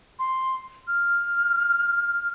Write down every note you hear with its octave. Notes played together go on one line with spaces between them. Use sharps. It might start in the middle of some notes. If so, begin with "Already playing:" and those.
C6
F6